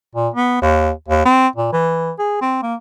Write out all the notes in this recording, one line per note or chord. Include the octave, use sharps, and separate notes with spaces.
A#2
B3
D#2
D#2
C4
A#2
E3
G#4
C4
A#3